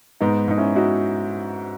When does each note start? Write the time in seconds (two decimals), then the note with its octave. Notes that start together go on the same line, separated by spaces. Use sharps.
0.21 G#2 B3 D#4
0.48 G#2 D#4
0.58 C#4 E4
0.76 D#4 E4 F#4